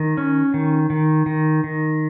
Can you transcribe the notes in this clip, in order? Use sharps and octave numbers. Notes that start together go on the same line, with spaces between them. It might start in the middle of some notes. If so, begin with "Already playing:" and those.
Already playing: D#3
C#4
D#3
D#3
D#3
D#3